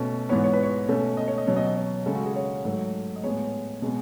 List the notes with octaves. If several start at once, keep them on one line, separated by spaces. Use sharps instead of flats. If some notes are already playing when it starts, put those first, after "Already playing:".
Already playing: B2 A3 C#4
G#2 E3 B3 C#5
C#5
B4
C#5
B2 A3 C#4
D#5
C#5
D#5
B2 F#3 C#4 C#5
D#5
D#5
C#5
C#3 G#3 C#4 A4
F#4
G#4
C#5
G#2 F#3 A3 C#5
D#5
A2 G#3 B3 C#5
B2 G#3 B3